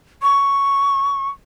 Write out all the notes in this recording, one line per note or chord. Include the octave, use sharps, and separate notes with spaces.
C#6